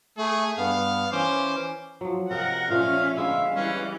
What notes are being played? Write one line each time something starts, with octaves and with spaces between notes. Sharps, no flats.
A3 G#4
G2 B3 F5
E3 C#4 C5 D6
F3 F#3
C3 A#4 D#5 F5 F#5
A#2 F3 A3 C#4 E5 F5
D3 G#3 B3 E5 F5
E3 G3 C#4